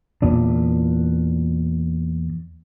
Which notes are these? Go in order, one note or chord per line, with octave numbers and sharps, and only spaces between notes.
E2 A#2 D4